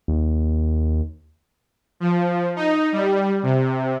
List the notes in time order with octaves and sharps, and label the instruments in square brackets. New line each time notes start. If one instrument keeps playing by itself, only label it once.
[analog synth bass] D#2
[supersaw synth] F3
D#4
G3
C3